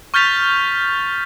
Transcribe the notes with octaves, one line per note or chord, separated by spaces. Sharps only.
C#6 F6 G6 A6 B6 F7